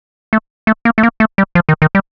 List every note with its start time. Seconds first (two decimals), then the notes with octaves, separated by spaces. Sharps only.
0.33 A3
0.67 A3
0.85 A#3
0.98 A3
1.03 A#3
1.20 A3
1.38 G3
1.55 F3
1.69 D#3
1.82 D#3
1.95 G3